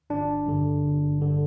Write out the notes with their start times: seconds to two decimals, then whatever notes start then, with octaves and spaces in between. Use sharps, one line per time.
0.10 G1 D4
0.46 G2 D3
0.83 G1
1.19 G2 D3